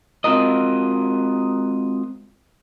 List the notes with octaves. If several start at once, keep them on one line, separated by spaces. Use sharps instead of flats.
G#3 C4 F4 F#4 A#4 D#5